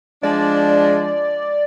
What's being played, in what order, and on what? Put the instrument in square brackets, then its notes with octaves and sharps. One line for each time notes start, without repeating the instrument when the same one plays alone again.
[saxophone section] F3 G#3 D4 [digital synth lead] D5